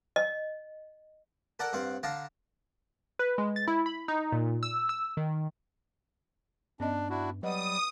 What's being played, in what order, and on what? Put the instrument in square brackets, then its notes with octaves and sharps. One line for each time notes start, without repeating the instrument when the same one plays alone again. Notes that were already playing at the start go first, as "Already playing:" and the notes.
[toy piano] D#5
[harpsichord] A4 A#4 D5 F#5 A#5
G2 C4 F5 F#5
D3 D4 F5 A5 A#5
[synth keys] B4
G#3
A6
E4
B5
D#4
A#2
E6
E6
D#3
[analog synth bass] G2 [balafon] B3 C#4 D#5 [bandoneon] D4
[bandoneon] D4 E4 F#4
[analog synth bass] F#3 [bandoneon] G3 [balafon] B4 D#5 F#5 [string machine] D#6